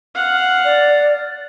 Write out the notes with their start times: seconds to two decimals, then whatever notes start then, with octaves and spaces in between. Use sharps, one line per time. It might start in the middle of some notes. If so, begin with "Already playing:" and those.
0.14 F5 F#5
0.65 D5